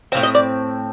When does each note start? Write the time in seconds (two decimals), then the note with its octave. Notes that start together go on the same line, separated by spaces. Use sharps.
0.12 A2 F3 C4 F5
0.23 D#5
0.35 D5